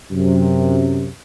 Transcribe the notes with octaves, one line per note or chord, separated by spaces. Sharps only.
F#2 C3